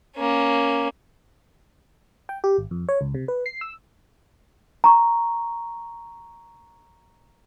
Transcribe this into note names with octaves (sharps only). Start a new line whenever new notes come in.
A#3 C#4
G5
G4
G#1
F2
C#5
C#2
C3
B4
C7
E6
A#5 C#6